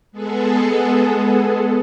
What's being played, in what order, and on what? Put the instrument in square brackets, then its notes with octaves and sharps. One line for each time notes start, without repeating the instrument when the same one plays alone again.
[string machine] G#3 B3 G#4 A4